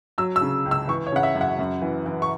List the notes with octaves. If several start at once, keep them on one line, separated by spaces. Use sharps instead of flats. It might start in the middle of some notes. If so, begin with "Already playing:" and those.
F#3 E6
E6
C#3
C#2
E6
E3 C#6
C#5
C#3 F#5
E5
F#2
F#5
F#2
E3
E3
C#6